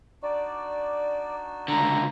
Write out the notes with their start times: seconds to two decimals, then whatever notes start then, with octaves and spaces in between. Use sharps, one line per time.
0.23 D4 D#4 F#4 D5
1.68 C#2 D3 A#5